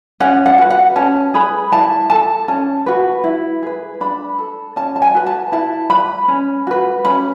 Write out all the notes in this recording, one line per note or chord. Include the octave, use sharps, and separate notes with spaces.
C#4 F#5
F#5
F#4 B4
F#5
C#4 A5
G#4 B4 B5
E4 A5
A4 A5
C#4 A5
F#4 B4
E4
G#4 B4
D4 B5
A4
C#4 A5
A5
G#5
F#4 B4
A5
E4 A5
B4 B5
C#4
F#4 B4
C#4 B5